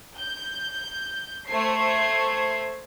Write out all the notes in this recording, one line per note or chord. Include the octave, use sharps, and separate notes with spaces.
G6
A3 C5 E5 G#6 C7